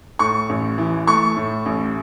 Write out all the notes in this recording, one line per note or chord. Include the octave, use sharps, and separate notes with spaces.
A2 C#6
A1
E3
A3 C#6
A2
A1